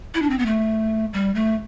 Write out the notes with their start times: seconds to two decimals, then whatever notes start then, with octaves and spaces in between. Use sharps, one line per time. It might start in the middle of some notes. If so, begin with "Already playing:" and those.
0.14 E4
0.22 D4
0.30 C4
0.39 B3
0.46 A3
1.13 G3
1.35 A3